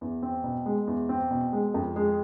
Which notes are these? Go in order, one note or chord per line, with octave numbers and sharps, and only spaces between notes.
E2
C4
B2
G#3
E2
C4
B2
G#3
F2
G#3